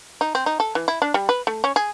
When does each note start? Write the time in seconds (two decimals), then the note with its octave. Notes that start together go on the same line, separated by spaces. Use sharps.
0.21 D#4
0.35 C4
0.46 D#4
0.60 A4
0.75 E3
0.88 E4
1.02 D4
1.14 G3
1.29 B4
1.47 A3
1.64 C#4
1.76 G#4